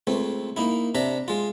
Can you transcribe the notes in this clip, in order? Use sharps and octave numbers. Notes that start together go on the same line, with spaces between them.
C#2 A3 C4
A#3 D#4 E4
C3 D4 E5 A#5
G#3 F4